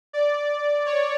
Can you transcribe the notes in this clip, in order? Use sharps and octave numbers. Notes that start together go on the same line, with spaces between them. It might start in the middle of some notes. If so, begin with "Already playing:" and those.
D5
C#5